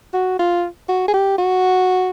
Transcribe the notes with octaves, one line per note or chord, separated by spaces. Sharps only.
F#4
F4
F#4
G#4
G4
F#4